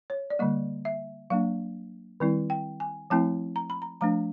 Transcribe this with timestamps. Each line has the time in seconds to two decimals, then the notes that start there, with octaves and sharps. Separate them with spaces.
0.10 C#5
0.30 D5
0.39 D3 G3 A#3 D#5
0.85 E5
1.30 F#3 A#3 D4 F5
2.20 D#3 G3 C4 E4
2.50 G5
2.80 G#5
3.10 F3 A3 C4 E4 A5
3.56 A#5
3.70 B5
3.82 A#5
4.01 F3 A3 D4 A#5